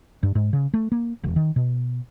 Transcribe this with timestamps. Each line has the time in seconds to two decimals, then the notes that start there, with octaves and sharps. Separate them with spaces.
0.23 G2
0.35 G#2
0.53 C#3
0.74 A3
0.92 A#3
1.24 E1
1.36 D#3
1.56 B2